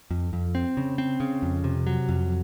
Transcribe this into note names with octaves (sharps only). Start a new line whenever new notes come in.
F2
F2
C4
C#3
C4
C#3
F2
C3
F#3
F2